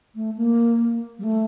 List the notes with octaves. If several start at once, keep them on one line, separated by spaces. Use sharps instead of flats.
A3
A#3
G3
A3